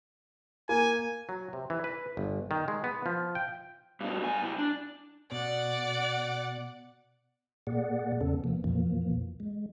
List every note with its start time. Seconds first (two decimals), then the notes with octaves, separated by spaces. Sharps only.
0.69 A#3 G#5
1.29 F#3
1.53 C3
1.70 E3
1.84 B4
2.17 G1
2.51 D#3
2.68 G#3
2.84 B3
3.06 F3
3.35 G5
4.01 G2 B2
4.20 G2 G#5
4.41 C2 E4
4.58 D4
5.32 B2 D5 F#5
7.67 A#2 A#3 G#4 D5 F#5
8.21 E2 C#3 B3 C#4 A4
8.44 C3 F3 A#3 B3
8.64 F2 A#2 E3 F3 A#3
9.40 G#3